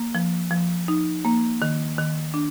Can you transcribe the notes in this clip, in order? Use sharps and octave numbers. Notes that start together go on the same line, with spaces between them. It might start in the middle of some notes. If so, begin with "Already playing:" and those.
Already playing: A#3
F3
F3
D#4
A#3
D#3
D#3
D4